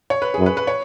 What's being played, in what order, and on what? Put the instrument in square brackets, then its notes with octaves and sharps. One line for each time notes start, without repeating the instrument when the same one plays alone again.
[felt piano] C#5
B4
[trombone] F#2 [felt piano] G#4
[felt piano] B4
B4
C#5